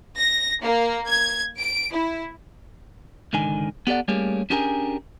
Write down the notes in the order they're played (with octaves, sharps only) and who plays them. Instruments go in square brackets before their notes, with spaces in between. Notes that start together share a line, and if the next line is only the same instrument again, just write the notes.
[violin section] A#6
A#3
G#6
D7
E4
[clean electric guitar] C#2 G#2 D3 D#3 G#5
B3 G4 A4 D5 F#5
G3 A3 A#3 C#4 G4 G#4
C#4 D4 G4 G#4 A#4 G#5